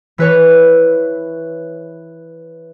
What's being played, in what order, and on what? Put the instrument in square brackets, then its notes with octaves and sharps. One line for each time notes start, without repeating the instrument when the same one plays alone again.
[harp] E3 B4 C#5